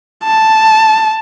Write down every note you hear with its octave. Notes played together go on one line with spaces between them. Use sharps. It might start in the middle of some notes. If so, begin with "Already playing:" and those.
A5